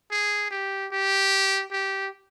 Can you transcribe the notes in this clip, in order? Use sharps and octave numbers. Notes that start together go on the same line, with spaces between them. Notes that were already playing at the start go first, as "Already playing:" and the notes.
G#4
G4
G4
G4